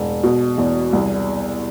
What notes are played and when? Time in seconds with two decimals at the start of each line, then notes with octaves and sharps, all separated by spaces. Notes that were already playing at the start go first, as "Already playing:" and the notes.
Already playing: E1
0.24 B2
0.58 E2
0.93 C2